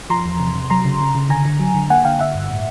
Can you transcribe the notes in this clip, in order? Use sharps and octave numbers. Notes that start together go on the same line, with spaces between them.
F3 A#5 C6
E2
C3
C3
F#3 A#5 C6
C#3
C#3
C#3
D3 G#5 A#5
D3
F#3
D3
A#3 F#5 G#5
D3 F5 G5
D3 E5 F#5
G2
A2